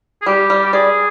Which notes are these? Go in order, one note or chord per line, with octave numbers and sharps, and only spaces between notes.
G#4
G3 G4
G3
G4
G#4 D5